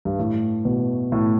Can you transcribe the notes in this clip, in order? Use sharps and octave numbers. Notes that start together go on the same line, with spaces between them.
G2
A2
B2
A2